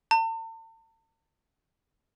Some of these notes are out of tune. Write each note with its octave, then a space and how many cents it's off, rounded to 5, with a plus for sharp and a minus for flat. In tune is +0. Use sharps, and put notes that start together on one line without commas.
A5 +45